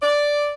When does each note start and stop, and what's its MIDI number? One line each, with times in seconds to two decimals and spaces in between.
0.02 0.50 74